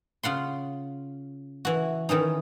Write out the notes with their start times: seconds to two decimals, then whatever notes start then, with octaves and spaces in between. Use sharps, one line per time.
0.23 C#3 F4 F#5 C6
1.65 E3 F#4
2.09 D#3 E3 C#4 D#4